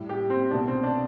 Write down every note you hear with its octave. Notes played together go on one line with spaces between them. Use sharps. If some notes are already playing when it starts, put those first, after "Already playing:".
Already playing: A2 G3
G4
C4
C2 B2 A3 D4
C4
D4